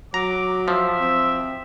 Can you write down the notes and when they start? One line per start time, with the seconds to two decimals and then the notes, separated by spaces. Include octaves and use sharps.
0.14 F#3 A#5 D6
0.68 F3 E5
1.00 C4